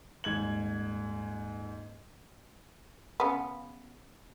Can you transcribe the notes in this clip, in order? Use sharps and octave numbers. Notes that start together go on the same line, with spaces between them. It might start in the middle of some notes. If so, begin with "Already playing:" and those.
D#1 G#2 G#6 F#7
C#3 B3